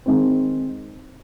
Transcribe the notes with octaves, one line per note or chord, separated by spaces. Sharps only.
D#3 G#3 C4